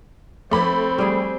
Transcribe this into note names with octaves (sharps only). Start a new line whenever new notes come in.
F3 A3 C4 B4 B5
G3 G#4